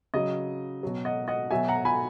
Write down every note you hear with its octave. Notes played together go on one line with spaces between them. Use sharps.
C#3 F#3 D#5
B2 F#3
D#5 F#5
D#5 F#5
B2 F#3 E5 G#5
F#5 A#5
G#5 B5